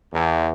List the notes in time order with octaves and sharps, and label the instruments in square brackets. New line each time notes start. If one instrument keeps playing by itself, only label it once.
[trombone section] E2